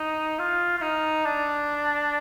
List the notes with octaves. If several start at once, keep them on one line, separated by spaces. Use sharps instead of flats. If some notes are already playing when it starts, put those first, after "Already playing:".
Already playing: D#4
F4
F4
D#4
D4